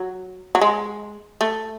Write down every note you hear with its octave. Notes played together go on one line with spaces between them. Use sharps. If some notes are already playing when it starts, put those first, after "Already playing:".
Already playing: F#3
F#3
G#3
A3